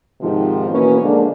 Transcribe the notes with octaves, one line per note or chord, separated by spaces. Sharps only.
G#2 C3 D#3 F3
B2 E3 A#3 C#4 B4
D3 F3 G#3 A#3 D4